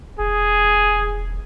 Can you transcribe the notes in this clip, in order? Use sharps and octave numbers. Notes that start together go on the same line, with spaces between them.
E1 G#4